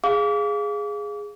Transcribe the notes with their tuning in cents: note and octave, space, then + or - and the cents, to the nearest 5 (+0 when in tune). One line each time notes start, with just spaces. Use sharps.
G#4 +0 F5 +0 D6 -35